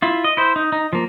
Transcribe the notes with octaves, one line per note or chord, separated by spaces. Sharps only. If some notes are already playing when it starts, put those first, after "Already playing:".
E4 F4
D#5
E4 C5
D#4
D#4
F3 A#3